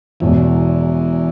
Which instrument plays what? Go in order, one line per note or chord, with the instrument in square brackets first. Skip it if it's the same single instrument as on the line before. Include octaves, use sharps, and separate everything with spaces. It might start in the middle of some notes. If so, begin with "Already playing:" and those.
[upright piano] E1 E2 B2 [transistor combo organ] E3